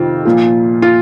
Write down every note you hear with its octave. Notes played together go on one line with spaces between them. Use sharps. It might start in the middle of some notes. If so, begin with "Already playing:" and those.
Already playing: F2 C3 D#3 C4 F4
A#2 F3
F4